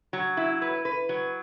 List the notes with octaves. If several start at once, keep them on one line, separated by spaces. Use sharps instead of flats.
F#3
E4
B4
B4
F#3